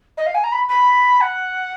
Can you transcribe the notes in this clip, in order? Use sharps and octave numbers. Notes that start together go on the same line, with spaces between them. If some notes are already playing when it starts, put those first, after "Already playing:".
D#5
F5
G#5
A#5
B5
B5
F#5